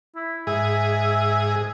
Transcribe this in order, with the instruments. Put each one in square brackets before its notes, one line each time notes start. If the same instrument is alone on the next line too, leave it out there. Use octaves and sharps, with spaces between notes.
[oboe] E4
[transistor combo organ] G#2 G#4 [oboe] E5